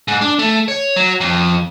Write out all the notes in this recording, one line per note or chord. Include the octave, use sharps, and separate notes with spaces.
G#2
D4
A3
C#5
F#3
F2